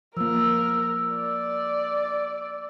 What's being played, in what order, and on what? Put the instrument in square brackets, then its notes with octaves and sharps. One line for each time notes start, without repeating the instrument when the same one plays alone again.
[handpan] F3 A#3 [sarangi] A#4 [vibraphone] E6
[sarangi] D5